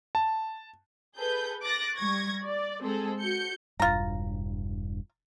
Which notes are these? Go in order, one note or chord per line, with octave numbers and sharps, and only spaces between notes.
A5
G#4 A4 B4 G6
D6 F#6 A6 A#6
G3 C#6 G#6 A#6
D5
G#3 C4 G#4 A4
F#4 G6 C#7
E1 G2 F4 A#5